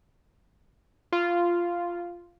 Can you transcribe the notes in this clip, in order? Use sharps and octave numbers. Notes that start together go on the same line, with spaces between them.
F4